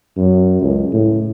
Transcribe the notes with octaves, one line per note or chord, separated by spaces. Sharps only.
F#2
C#2
A2